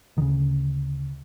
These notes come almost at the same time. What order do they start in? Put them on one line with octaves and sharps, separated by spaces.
D2 D#3 C#3